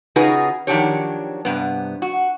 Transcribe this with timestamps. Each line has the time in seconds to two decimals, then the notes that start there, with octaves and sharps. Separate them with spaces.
0.16 C#3 D#4 F4 F#4 G#4 B4
0.67 D#3 F3 F#3 D4 G4 C#5
1.45 G2 C3 B3
2.02 F#4